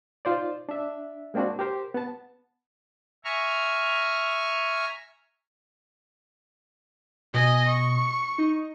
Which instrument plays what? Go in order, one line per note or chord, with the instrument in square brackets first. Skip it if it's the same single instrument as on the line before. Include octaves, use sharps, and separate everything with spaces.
[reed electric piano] D#4 F4 C5 D5
D4 E5
G#3 A#3 C4 D4 F#4
G4 A#4 C5
B3 A5
[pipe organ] E5 G#5 A#5 C#6 F6
[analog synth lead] B2 [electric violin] D#5 G#5
[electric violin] C#6
[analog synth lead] D#4